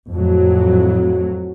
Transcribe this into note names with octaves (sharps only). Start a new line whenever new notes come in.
F2 A2 F#3